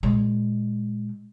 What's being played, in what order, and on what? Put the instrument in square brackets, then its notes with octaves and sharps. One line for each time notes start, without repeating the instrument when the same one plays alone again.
[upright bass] A#2 G#3